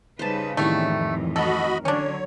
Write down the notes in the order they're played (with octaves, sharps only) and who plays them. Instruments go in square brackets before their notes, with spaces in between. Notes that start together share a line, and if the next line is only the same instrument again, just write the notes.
[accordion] C#3 [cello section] G3 D#4 B4 [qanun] C5 A5
[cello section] F2 A2 E3 [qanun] D#3 G3 E4 [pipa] A3 C#5
[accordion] F#4 D#5 B5 [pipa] A4 [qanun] A#4
[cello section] D3 F#3 [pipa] C#4 D4 [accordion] C#5